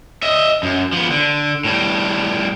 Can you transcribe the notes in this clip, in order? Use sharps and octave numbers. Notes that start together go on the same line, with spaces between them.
D#5 E5
F#2
F3 B3
D3
A2 G3